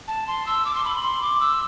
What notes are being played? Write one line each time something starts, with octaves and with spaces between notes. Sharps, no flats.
A5
C6
E6
D6
C6
B5
C6
D6
E6